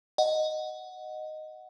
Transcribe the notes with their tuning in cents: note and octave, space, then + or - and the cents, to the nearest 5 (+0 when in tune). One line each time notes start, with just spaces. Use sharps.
D#5 -5 F#5 +0